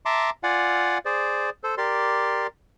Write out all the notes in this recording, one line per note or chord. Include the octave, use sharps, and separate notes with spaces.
E5 A5 A#5 C6 D6
F4 D5 F5 F#5 G#5
G#4 C5 D5
A4 C5
G4 A#4 D5 C6